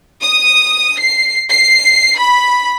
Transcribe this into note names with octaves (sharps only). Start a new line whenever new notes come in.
D#6
C7
C7
B5